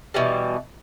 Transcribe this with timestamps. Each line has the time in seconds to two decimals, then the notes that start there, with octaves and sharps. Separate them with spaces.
0.14 B2 E3 G3